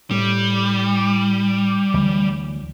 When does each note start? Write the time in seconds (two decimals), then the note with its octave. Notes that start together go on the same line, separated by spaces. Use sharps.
0.11 A2 G3
1.94 D2 E3 F#3